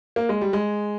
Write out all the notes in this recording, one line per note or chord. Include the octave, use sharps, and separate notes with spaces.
A#3
G#3
G3
G#3